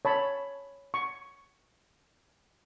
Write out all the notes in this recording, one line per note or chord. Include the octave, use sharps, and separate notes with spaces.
C#5 A5 B5
C#6